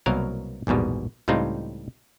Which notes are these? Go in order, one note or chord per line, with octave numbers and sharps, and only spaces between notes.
C2 B2 F#3 A#3 A#4 F5
A#1 E2 G#2 B2 G3
C#2 A2 G3 C4 D#4 F4